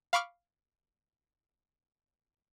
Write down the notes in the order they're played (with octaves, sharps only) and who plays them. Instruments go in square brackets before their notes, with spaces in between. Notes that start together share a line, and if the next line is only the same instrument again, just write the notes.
[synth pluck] F5 B5 C#6 D6 F6